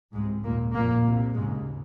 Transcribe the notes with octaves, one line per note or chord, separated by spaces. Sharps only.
C#2 G#2 C3 G#3
D#2 A#2 C#3 A#3
F2 A#2 C#3 A#3
C2 C3
D#2 G#2 C#3 G#3